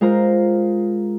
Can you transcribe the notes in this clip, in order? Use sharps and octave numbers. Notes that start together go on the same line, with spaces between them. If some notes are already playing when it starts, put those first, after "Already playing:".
G#3 F4 A#4 C5 A#5